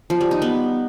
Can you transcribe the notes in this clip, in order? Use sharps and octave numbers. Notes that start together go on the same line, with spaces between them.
F3
G3
D#4
B3